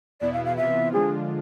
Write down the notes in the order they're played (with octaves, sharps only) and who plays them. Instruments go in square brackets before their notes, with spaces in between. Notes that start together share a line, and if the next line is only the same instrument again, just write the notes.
[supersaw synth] E2 B2 B3 E4 [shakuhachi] D5
[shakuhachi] F5
F5
[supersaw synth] C3 E3 B3 F4 [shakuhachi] E5
[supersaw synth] D3 F3 G#3 D4 F4 [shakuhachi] G#4